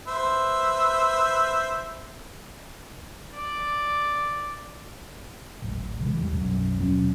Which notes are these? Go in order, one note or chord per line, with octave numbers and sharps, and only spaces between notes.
B4 C5 E5
D5
D1 G#1
C3 E3 G#3
D1 E2 E3 G3
B1 F#2
D#1 B2 F#3 C#4